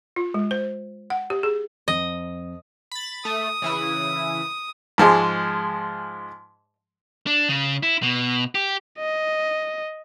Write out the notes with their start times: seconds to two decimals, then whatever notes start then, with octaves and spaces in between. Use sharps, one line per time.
0.16 F4
0.34 G#3
0.51 C5
1.10 F#5
1.30 G4
1.43 G#4
1.88 F2 D#5
2.91 B5 A6
3.25 A3 D#6
3.62 C#3 E3 E4
4.98 G#2 F3 G#3
7.27 D4
7.49 C#3
7.83 E4
8.03 B2
8.55 G4
8.99 D#5